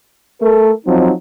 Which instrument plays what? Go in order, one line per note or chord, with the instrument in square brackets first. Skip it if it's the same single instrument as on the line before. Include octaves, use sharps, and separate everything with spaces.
[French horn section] A3 A#4
F3 F#3 C4 D#4